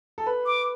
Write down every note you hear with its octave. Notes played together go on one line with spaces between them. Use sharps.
A4
B4
D6